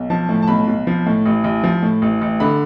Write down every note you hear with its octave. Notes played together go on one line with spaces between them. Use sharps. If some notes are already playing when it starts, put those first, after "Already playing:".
Already playing: B1
F3 A5
A2
A5
B1 B5
B1
F3
A2
A1
A1
F3
A2
A1
A1
D3 B5